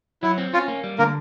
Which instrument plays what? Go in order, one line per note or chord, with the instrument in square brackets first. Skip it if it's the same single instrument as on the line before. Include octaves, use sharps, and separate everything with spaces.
[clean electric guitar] F#3 [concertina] E4
[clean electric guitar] C4
[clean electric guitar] C#4 [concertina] F4
[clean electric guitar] A#3
G3
[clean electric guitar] D3 [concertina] A#3 A#4